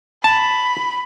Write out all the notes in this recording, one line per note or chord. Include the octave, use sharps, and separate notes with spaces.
A5 B5